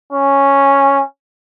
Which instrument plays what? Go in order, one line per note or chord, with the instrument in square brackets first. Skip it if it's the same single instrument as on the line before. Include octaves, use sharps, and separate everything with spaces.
[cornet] C#4